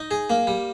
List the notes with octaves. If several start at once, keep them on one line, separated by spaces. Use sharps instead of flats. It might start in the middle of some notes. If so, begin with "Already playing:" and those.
Already playing: D#4
G#4
A#3
G3